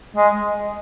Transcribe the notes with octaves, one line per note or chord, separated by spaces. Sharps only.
G#3